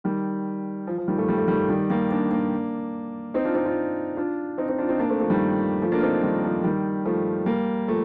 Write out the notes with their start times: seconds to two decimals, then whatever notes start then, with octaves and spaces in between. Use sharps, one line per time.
0.04 D#3 G3
0.87 F3
0.98 F3
1.08 D#3 G3
1.18 F3 A3
1.29 G3
1.38 A3
1.48 D#3 G3
1.69 D#3 G3
1.90 G3 A#3
2.11 A#3 D4
2.31 A#3 D4
3.34 C4 D#4
3.45 D4 F4
3.55 C4 D#4
3.65 D4 F4
4.17 D4 F4
4.58 C4 D#4
4.68 C4 D#4
4.78 D4 F4
4.89 C4 D#4
4.99 A#3 D4
5.10 A3 C4
5.20 F3 A3
5.30 D#3 G3
5.82 F3 A3
5.92 A#3 D4
5.98 F4
6.02 C4 D#4
6.23 D#3 G3
6.44 F3
6.64 D#3 G3
7.05 F3 A3
7.46 G3 A#3
7.88 F3 A3